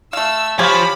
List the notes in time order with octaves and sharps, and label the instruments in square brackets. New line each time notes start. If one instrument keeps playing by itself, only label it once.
[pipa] A3 F5 [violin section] E6
[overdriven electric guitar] F3 [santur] G4 C#5 F5 [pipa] G#5 [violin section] B5